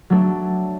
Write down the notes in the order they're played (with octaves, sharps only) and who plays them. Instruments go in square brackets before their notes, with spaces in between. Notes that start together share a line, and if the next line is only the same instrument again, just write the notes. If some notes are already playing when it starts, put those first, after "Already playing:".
[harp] F#3 A3 D4 A4